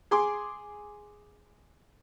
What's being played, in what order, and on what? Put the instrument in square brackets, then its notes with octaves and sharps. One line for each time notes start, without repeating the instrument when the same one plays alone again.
[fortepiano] G#4 G#5 C6 D6